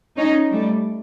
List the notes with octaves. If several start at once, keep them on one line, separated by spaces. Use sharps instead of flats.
C#4 D#4
G3 A3